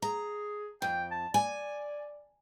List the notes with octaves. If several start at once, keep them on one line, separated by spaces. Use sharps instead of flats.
G#4 A#5
F2 G5
A5
D5 G#5